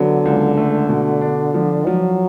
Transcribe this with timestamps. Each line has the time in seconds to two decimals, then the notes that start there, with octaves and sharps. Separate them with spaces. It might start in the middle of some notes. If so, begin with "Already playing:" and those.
Already playing: D3 F#3 B3
0.25 C#2
0.57 A3
0.89 B2
1.21 D4
1.54 F3
1.86 F3 F#3